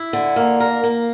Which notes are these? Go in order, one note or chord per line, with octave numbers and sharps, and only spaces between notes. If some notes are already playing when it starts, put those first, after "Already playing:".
Already playing: E4
D3
A#3
A#4
A#3